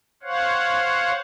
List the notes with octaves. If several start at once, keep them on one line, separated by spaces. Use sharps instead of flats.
C5 C#5 F5 F#5